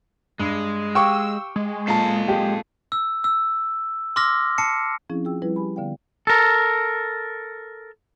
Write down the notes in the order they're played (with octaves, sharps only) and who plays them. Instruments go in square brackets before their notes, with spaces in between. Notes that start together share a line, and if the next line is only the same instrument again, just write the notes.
[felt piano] G2 [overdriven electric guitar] G#3
[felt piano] G4 F5 D6 [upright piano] G5 C#6 [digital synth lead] E6
[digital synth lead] G#3
[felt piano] A#2 A5 [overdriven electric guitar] A4 F5
[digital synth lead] G#3 [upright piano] G4
[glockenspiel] E6
E6
C6 D6 E6 F6 A#6
A5 C7 C#7
[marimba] F3 C4 C#4 E4 G#4
F4 G#4 G5 E6
F3 G3 E4 G#4 B4
G4 G#5 B5
D3 B3 D5 F5 G5
[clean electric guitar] A4 A#4